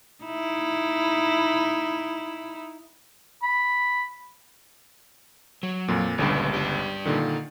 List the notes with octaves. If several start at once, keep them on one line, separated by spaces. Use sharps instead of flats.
D#4 E4
B5
F#3
F2 A#2
G1 C#2 G2 A#2 D3 G4
G3 D4 G4
A#2 D3 D#3